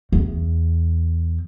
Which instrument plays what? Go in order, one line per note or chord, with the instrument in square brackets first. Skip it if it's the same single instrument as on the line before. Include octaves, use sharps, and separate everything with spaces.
[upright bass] E2